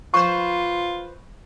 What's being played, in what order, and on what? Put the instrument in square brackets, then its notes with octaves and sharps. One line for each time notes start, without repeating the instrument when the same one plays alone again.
[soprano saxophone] F4 [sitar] B4 C5 [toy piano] C#6